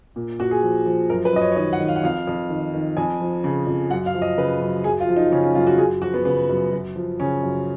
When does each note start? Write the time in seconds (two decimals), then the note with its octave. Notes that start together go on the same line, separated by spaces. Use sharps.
0.16 A#2
0.39 A#2 F#4
0.51 G#4
0.63 F3
0.86 F3
1.10 F#2 A#4
1.25 B4
1.33 F#2 D#5
1.41 C#5
1.52 C#5
1.56 D#3 D#5
1.73 F#5
1.80 D#3
1.88 F5
1.96 F#5
2.03 F2 F5
2.27 F2
2.50 D#3
2.74 D#3
2.97 F2 G#5
3.21 F3
3.44 C#3
3.67 F2
3.90 F#2 F#5
4.06 F5
4.15 F3
4.22 D#5
4.38 C#3 B4
4.61 F#2
4.84 F#2 G#4
5.01 F4
5.09 F3
5.16 D#4
5.32 C#3 C#4
5.44 C#4
5.55 F#2 F4
5.67 F#4
5.78 F#2 G#4
6.02 F3 F#4
6.14 B3
6.25 C#3 B3
6.49 F#2
6.72 F#2
6.96 F3
7.19 C#3 C#4
7.43 F#2